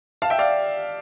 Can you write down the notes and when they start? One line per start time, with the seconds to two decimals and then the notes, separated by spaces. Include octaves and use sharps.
0.22 F5 A5
0.30 E5 G5
0.39 D5 F5